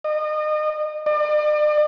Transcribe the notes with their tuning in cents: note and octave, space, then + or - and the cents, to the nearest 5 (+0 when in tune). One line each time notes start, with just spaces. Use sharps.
D#5 -35
D5 +40